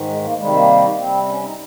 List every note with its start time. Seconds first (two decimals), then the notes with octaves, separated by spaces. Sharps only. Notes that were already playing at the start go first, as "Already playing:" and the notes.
Already playing: G#2 D#3
0.08 G#3
0.23 A#3
0.38 C3 D#3 G3 G#3
0.53 A#3
0.98 C3 G3 C4
1.28 C#4
1.43 D#4